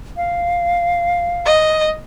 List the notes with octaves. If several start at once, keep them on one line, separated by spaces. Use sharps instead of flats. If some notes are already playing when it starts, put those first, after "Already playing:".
F5
D#5